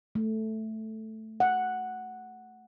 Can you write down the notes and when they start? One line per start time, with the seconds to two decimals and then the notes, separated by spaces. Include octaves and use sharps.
0.15 A3
1.40 F#5